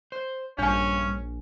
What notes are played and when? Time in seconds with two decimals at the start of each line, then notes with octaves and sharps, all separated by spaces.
0.12 C5
0.59 A#1 G2 C#4 D4 G#5